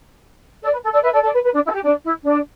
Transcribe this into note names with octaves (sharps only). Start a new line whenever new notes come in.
A4 D5
B4
A4
A4 D5
B4 E5
A4 D5
A4 D5
B4
B4
D4
E4
A4
G4
D4
E4
D4